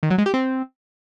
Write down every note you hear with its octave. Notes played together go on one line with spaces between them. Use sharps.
D#3
F#3
G#3
G4
C4